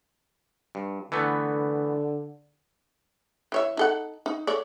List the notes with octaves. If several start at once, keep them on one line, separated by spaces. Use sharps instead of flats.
G2
D3 E3 A3 B3
E3 C#5 E5
D#4 A4 F#5
D#4
A4 C#5 D5